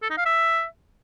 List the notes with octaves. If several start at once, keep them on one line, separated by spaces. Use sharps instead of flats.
A4
D#4
F5
E5